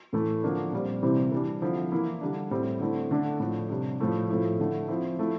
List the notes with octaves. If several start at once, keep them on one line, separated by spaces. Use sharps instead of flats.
A2 E3 A3 E4
D3 F3 A#3 D4
A#2 G3 C4
C3 E3 G3 C4 E4
E3 G3 D4
D3 F3 C4 E4
E3 A#3 E4
D3 G3 D4
A2 G3 C4 E4
D3 A3 C4 E4
D3 A3 D4
A2 F3 A3
C3 G3 D4
A2 F3 A3 E4
A2 F3 A3 E4
D3 A3 E4
F3 C4 E4
F3 A3 E4